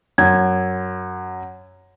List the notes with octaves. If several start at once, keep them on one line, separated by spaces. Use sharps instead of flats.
F#2 G#6